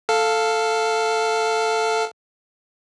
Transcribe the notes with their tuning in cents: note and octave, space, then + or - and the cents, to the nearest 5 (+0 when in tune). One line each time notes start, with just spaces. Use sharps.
A4 +5 F5 +0